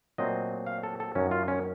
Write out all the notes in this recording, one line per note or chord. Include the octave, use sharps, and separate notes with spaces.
A#2 F#3 A3 C4 D#5
F5
A4
A4
F#2 D#3 F#3 C#4
F4
C#4